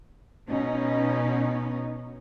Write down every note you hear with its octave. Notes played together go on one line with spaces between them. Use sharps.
B2 C#4 D#4